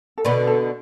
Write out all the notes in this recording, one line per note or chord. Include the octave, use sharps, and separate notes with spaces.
A4
B2 D3 B4
A4